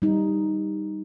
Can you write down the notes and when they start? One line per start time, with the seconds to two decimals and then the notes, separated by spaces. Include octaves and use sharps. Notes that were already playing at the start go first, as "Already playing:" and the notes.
0.02 G3 D#4